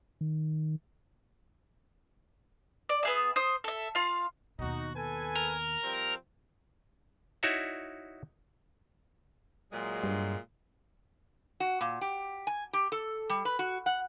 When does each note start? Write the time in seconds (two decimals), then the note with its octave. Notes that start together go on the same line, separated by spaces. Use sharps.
0.21 D#3
2.89 D5
3.03 B3 G#4 E5
3.36 C5 D#6
3.64 A4 E5
3.95 F4 F5
4.59 D#2 B2 D#4 F#4
4.95 A4 B4 G#5
5.36 A#4
5.83 F3 G3 C4
7.43 D#4 E4 F#4 C#5 D5 E5
9.72 A#2 F#3 G#3
10.03 G2
11.60 F#4
11.81 A#2
12.01 G4
12.47 G#5
12.73 G4
12.92 A4
13.30 G3
13.45 B4
13.59 F#4
13.86 F#5